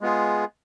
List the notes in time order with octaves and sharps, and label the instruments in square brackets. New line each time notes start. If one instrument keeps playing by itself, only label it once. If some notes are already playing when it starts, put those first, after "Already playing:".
[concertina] G#3 B3 F4 G#4